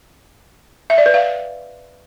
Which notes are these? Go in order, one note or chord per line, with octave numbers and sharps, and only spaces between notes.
E5
D5
B4
F5